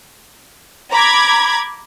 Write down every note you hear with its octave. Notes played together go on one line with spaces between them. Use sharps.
A#5 B5 D6 G#6